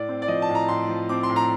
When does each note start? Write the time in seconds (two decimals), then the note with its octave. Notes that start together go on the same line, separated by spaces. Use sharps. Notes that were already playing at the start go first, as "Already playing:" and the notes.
Already playing: A2 D5
0.09 C4
0.22 D5
0.28 F3 D#5
0.42 A5
0.49 A2
0.55 A#5
0.68 A2 C6
0.89 F3
1.09 C4 D6
1.23 C6
1.30 A2
1.36 A#5